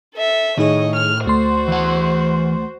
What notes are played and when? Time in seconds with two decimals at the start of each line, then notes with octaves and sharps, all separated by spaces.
0.14 A4 E5
0.58 A2 D#3 D#4 G#4 C#5 D#5
0.95 F6
1.26 D2 A3 F#4 C5 C6
1.68 E3 F#5